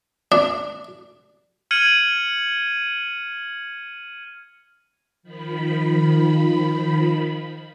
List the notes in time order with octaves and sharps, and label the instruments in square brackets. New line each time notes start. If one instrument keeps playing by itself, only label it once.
[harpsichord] D4
[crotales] F6 G#6 C#7 D#7 F#7
[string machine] D#3 F3 B5